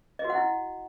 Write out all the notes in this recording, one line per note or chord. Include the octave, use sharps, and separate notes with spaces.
D#5
F#4
F#5
E4